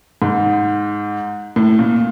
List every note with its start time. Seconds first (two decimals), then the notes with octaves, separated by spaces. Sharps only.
0.22 G#2
1.56 A2
1.79 A#2